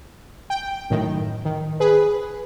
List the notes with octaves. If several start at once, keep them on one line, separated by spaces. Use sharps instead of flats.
G5
F#2 A2 D#3
D#3
G#4 B4